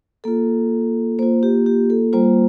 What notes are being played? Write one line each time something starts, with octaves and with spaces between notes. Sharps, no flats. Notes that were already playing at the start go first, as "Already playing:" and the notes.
A#3 F4 A4
A#3 F4 C5
G4
G4
A4
G3 A#3 F4 C5